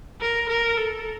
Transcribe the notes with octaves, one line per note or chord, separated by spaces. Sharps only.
A#4
A#4
A4